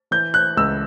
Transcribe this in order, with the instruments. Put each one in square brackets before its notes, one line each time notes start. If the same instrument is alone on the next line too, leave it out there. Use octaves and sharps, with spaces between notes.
[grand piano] E3 G6
F#6
C#2 E6